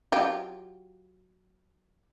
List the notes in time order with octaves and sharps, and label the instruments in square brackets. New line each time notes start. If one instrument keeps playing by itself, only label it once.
[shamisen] F#3 F4 G4